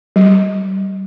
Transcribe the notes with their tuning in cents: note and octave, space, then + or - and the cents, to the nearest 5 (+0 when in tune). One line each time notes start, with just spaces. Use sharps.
G3 -30